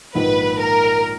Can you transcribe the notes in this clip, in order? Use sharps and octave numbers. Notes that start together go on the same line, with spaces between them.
A#1 G#2 D#3 A#3 D#4 B4
A#4